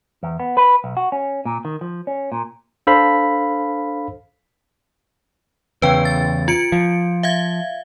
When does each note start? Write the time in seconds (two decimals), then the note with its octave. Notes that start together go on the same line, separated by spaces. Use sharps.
0.23 E2
0.40 B3
0.57 B4
0.84 B1
0.97 F#4
1.12 C#4
1.45 A#2
1.65 D#3
1.81 F3
2.07 C#4
2.32 A#2
2.87 D4 A4 C5 F5 B5 B6
5.82 E2 C#3 B4 G5
6.05 A6
6.48 F4 C#7 D7
6.72 F3
7.23 E5 F5 G#6